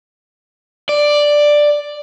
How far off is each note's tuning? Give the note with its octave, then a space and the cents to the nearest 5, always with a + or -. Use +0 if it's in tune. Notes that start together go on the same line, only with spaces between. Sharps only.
D5 +5